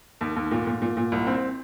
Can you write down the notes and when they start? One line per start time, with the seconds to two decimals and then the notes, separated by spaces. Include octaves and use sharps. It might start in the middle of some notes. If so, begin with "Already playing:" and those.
0.21 D#2
0.36 D#2
0.51 A#2
0.67 A#2
0.82 A#2
0.97 A#2
1.12 C2
1.27 C4